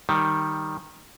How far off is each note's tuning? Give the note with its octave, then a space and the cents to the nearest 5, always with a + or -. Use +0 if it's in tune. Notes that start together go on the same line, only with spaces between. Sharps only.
D#3 +0 G3 +0